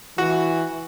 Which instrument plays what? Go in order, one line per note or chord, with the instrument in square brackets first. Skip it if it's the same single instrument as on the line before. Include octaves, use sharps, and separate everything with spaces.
[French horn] E3 [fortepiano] F#4